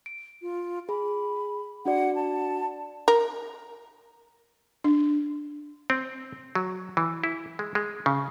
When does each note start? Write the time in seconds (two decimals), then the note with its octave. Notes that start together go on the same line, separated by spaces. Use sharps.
0.06 D7
0.42 F4
0.89 G#4 B5
1.86 D4 F#4 D5 F#5
2.15 A5
3.08 A#4
4.84 D4
5.90 C4
6.55 F#3
6.97 E3
7.24 E4
7.59 G#3
7.75 G#3
8.06 C#3